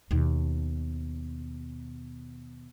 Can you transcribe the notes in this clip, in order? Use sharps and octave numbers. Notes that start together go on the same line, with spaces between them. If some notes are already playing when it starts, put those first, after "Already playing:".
D#2 B2